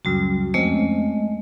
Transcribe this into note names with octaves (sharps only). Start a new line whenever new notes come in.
C#2 F#2 C#3 G3 F#4
F2 G#3 A3 C4 C#4 D#5